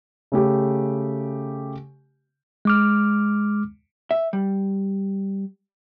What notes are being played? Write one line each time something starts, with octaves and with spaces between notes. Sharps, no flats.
C#3 A3 G4
G#3 D6 F6
E5
G3